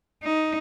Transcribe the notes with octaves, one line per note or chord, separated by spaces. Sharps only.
D#4